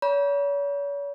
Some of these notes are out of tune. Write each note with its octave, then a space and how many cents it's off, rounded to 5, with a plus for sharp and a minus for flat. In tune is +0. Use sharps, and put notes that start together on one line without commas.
C#5 +40 B5 -40